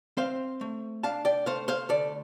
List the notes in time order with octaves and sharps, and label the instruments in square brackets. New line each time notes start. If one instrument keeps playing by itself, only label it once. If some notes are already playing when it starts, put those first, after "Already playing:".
[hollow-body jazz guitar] C4 C5 F5
A3
D4 F5 A5
D5 G5
A3 C5 F5
C5 F5
D2 A4 D5